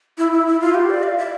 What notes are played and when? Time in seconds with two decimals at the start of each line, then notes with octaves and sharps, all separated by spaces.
0.18 E4
0.32 E4
0.47 E4
0.61 F4
0.75 G4
0.90 D5
1.03 F5
1.17 E5